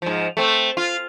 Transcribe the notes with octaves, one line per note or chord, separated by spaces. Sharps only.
G#2 F3
A3 C4
F4